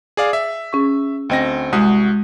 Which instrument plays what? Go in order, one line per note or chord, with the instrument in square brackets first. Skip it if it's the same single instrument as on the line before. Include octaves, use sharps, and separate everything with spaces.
[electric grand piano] G#4 D5 F5
E5
[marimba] C#4 G#4 C#6
[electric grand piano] D2 C4 A#6 [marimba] D#5 G5
[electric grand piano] C2 F#4 D#6 [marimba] G#3